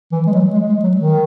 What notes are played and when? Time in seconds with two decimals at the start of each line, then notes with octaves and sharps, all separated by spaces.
0.12 E3
0.26 G#3
0.32 F#3
0.54 G#3
0.69 G#3
0.83 F#3
0.96 D#3